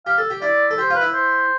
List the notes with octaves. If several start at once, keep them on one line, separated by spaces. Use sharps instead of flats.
G4 F5
A4
G4
E4 D5
A4
G4 C5
F4 B4
E4
C5